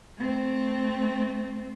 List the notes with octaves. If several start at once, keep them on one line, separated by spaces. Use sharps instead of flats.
A3 C4